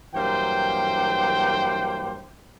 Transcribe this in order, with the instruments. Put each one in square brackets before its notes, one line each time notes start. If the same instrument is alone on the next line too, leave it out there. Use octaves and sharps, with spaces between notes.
[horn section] G2 E3 F#3 A#3 C5 G5